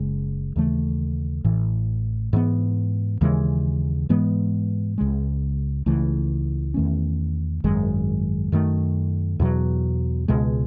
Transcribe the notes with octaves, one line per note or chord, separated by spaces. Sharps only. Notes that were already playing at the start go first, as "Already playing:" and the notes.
Already playing: F#1 C#3 G#3
D#2 C#3 E3 A3
A1 A2 E3
G#2 E3 B3
D#2 C#3 E3 G#3
G#2 E3 G#3 B3
C#2 C#3 G#3
C#2 C#3 E3 A3
E2 D#3 A3 C#4
G#1 F#2 D#3 G#3
F#2 D#3 A3
E2 B2 F#3
C#2 B2 G#3